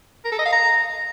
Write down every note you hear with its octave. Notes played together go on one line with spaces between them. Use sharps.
A#4
A4
D#5
F5
A#5